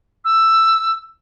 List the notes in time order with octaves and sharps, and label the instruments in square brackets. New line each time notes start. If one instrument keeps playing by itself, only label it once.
[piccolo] E6